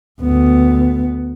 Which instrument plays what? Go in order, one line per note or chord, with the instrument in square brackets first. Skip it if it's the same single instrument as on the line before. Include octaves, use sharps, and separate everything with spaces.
[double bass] D2 B3